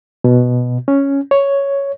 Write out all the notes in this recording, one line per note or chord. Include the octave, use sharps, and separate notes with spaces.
B2
C#4
C#5